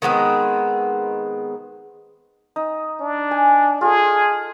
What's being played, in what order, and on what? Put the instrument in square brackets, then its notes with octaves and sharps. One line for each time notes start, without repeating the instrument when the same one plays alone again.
[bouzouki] D#3 G#3 B3 C4
[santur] D#4
[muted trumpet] D4
[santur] G#5
[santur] F4 A4 [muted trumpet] G#4